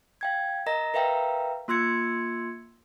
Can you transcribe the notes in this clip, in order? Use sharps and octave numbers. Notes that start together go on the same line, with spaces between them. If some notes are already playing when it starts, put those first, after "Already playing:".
F5 G5 G#6
A#4 D#5 A#5 A#6
A#4 B4 E5 F5 G5 A#5
A#3 F4 C6 E6 G#6 C#7